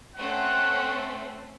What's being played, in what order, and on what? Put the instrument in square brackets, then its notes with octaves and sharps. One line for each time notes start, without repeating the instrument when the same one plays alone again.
[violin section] A3 C4 C#4 [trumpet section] F#5